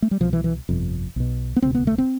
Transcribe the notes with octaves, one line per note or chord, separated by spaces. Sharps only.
A3
G3
C2 B2 F3
E3
E3
G1 F2 C3
B1 B2
B3
E1 D2 C3 C4
B3
A3
C4